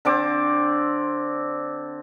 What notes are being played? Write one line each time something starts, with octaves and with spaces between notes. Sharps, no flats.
D3 C4 D6